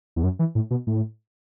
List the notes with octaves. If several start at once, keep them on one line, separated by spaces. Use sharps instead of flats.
E2
F#2
E3
A2
B2
A2